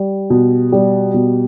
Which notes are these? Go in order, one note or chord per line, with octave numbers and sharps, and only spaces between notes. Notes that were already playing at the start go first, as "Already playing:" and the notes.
Already playing: G3
B2
G3
B2